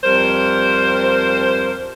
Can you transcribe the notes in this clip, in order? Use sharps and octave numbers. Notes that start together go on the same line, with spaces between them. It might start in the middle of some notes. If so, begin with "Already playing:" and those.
F2 G3 A#4 C5